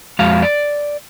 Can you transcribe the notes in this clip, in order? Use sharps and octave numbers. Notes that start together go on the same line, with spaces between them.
F2 G#3 F#4 F5
D5